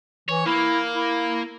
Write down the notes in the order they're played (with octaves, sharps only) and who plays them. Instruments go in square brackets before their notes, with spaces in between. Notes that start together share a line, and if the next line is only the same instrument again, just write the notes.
[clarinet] E3 [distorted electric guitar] C#5
[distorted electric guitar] A#3 [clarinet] E4
[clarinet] E4